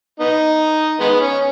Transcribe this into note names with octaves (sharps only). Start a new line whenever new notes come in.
B3 D#4
D#3 G#3 B3
C#4